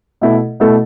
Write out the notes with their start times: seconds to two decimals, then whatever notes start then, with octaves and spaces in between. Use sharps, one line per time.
0.21 B2 A3 E4 A4
0.60 B2 A3 E4 A4